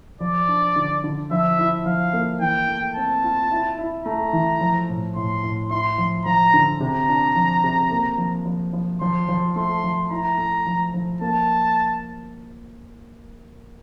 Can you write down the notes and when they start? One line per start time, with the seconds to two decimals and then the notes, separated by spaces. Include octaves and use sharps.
0.20 F3 D5
0.48 D4
0.76 D3
1.04 D3
1.31 F3 E5
1.59 E4
1.86 F3 F5
2.13 A#3
2.41 E3 G5
2.69 A3
2.96 C4 A5
3.24 F4
3.51 E4
3.79 E4
4.05 A3 A#5
4.33 E3
4.61 F3
4.89 A2
5.16 A2 C6
5.44 A2
5.70 E4 C6
5.98 F3
6.26 F3 A#5
6.54 D3
6.81 C3 A#5
7.09 D4
7.36 F3
7.64 C3
7.91 A#3
8.18 F3
8.46 F3
8.73 F3
9.01 F3 C6
9.29 F3
9.56 A3 C6
9.84 F3
10.11 E4 A#5
10.38 A3
10.66 F3
10.94 F3
11.21 A#3 A5